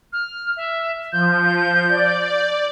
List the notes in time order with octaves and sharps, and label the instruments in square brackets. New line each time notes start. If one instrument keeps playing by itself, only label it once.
[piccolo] F6
E5
[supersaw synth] F3 [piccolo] G6
[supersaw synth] D5